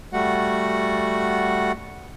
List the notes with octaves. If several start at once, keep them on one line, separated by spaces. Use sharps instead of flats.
G3 A3 F#4 F#5